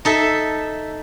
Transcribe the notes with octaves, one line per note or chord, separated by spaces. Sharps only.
D#4 A4 E5